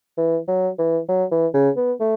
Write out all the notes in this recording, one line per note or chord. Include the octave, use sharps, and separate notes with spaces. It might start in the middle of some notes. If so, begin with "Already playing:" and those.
E3
F#3
E3
F#3
E3
C#3
B3
A3